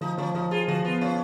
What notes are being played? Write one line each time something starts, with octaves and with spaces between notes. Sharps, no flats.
F3 D#4
F3 C#4
F3 D#4
F4 G#4
F3 F#4
B3 F4
C#4 F4